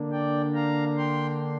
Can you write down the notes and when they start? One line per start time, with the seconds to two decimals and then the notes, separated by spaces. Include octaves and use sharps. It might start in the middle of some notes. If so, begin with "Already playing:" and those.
Already playing: D3 A#3 D4
0.12 D5 G5
0.54 F5 A#5
0.97 G5 C6